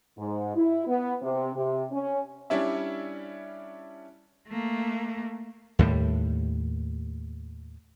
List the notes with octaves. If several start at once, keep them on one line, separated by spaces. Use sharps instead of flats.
G#2
E4
B3
C3
C3
C#4
G3 C#4 D4 E4 E5
A3 A#3
D#2 A2 G3